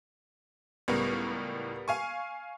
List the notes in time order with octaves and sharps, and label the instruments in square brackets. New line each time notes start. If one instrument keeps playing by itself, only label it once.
[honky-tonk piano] C#2 A2 [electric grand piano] G3 B3 A#4
[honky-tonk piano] F5 G#5 C#6